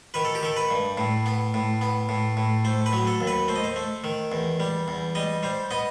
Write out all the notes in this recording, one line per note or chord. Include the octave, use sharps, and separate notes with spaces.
D#3 B4
A4
G4
D#3 A4
B4
G2
A2
B3
A2
B3
A2
A2
A3 C5
B4
F#3
A4
D#2
B4
A3 C5
D#5
C5
A3
D#3
E2
G3
E2
G3 D#5
G3 C5
B3 D#5